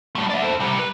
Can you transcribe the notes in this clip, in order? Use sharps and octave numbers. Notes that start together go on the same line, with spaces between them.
G3 A3
D5 E5
A4 C5
C3 G3
B4